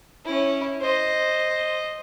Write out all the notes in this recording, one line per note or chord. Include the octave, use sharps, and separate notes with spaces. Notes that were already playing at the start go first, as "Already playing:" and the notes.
C#4 E4
C5 D#5